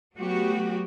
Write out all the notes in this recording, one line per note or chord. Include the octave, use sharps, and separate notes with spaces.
F#3 A3 B3 F#4 G4